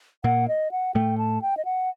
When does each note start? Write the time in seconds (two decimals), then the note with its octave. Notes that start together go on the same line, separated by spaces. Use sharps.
0.24 A#2 A#3 F#5
0.48 D#5
0.72 F#5
0.95 A2 A3 G5
1.18 A5
1.42 G5
1.57 D#5
1.65 F#5